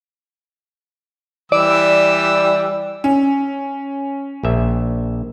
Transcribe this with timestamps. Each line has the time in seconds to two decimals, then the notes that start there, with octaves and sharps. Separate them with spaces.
1.52 E3 G3 D5 E6
3.04 C#4
4.43 A#1 E5